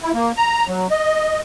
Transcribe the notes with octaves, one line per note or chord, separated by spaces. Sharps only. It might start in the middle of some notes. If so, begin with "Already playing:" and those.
E4
A#3
A#5
F#3
D#5